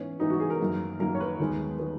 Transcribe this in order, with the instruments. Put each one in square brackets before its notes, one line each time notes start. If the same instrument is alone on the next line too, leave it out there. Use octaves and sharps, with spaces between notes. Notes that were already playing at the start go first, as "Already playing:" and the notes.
Already playing: [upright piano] G#2 E3 B3 C#4
G#2 E3 B3 D#4
F#4
G#4
A#4
F#2 D#3 A#3
F#2 D#3 A#3 A#4
C#5
B4
D#2 D#3 G#3 B3
D#3 G#3 B3